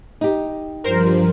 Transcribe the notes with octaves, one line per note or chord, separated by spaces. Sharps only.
D#4 G4
G2 F3 G3 A#4 C5